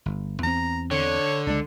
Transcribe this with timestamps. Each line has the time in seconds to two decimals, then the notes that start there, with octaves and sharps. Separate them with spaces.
0.06 G1
0.43 E2 C4 A#5
0.91 D3 C#5
1.47 C#2 G#3 D4